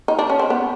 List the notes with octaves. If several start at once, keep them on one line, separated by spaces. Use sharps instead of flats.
D#4
D4
C#4
C4
B3